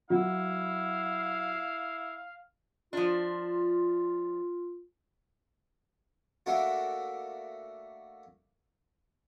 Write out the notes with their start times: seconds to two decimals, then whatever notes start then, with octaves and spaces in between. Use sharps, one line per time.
0.10 F#3 E4 F5
2.93 F3 D4 F4
6.46 A3 A#3 D4 F#4